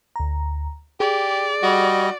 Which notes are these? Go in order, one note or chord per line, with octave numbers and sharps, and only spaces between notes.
D2 A#5
G4 G#4 D5
G3 F#4 D#5